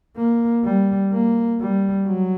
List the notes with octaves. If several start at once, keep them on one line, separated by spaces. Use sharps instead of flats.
A#3
G3
A#3
G3
F#3